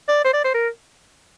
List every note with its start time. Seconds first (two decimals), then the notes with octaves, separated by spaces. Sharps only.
0.08 D5
0.24 C5
0.33 D5
0.44 C5
0.55 A#4